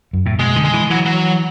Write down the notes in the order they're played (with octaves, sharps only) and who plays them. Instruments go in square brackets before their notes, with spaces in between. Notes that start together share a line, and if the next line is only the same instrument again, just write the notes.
[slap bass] F#2
A2
[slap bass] B2 [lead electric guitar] G#3
[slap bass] D3
[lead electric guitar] G#3
[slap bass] E3
[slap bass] E3 [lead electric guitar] F#3
[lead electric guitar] F#3